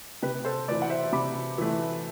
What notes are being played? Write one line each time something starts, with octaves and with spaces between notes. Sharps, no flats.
C3 G4 B4
A4 C5
E3 A3 B4 D5
F#5
C5 E5
C3 B5 D6
E3 A3